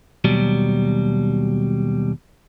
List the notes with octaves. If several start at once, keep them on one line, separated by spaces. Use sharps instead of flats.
D#2 B2 F#3 G3